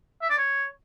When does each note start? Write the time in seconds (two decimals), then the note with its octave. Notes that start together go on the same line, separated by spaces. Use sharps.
0.22 E5
0.30 D5
0.37 C#5